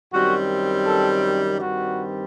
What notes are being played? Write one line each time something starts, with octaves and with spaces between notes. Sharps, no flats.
F#2 D#3 G3 C4 F#4
A4
G2 D#3 G3 C4 F#4